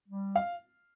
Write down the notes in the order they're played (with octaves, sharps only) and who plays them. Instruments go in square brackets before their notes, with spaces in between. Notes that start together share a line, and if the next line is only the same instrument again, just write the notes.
[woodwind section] G3
[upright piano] F5